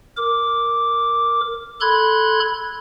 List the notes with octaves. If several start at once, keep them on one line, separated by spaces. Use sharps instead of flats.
A#4 D6
A4 B5 C6 F#6 G#6